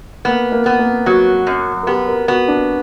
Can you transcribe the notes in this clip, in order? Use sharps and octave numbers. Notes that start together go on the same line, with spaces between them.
A#3 B3
A#3
B3
A#3
F#3 F#4
F#2
A#4
B3 G4
A#4
B3 F#4
D4